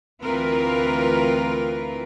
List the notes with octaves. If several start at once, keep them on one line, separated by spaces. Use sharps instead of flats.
D2 E3 C4 F4 A#4 B4